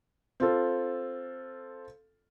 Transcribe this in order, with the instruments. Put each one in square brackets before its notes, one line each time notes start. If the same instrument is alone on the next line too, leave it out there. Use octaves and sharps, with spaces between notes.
[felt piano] C4 F4 A4